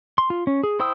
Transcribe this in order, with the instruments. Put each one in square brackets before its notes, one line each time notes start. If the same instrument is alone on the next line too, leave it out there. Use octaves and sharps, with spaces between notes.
[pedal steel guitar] C6
F4
C#4
G#4
E4 C5 G5 D#6 E6